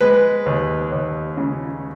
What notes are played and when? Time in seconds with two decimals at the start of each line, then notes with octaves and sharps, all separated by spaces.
0.01 G#3 B4
0.46 D#2
0.92 D#2
1.37 C#3